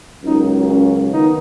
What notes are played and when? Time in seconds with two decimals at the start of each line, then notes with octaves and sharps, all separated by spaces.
0.23 C#2 C#3 F#3 A#3 D#4
0.66 C#4
1.10 D#3 B3 D#4